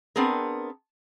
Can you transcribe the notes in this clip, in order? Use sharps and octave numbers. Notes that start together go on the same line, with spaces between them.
B3 C4 D4 G#4 A#4